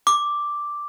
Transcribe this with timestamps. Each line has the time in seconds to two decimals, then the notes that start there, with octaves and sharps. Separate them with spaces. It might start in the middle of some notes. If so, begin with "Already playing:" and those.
0.07 D6